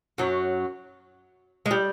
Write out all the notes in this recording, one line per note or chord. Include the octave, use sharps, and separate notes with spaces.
F#2 F#3
G#3
G3